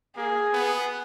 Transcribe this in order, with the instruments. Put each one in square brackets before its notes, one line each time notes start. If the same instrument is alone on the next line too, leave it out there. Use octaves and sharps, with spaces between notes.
[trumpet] A#3 [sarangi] G#4
[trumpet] B3